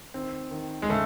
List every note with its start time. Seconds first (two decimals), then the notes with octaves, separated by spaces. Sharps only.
0.14 D#3 C4
0.51 D#3
0.82 G#3
0.90 C#3 A3